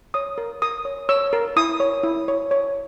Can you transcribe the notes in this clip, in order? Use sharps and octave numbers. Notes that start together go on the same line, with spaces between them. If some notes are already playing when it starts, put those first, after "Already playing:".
C#5 D#6
A#4
A#4 D#6
C#5
C#5 E6
A#4
E4 D#6
C#5
E4
C#5
C#5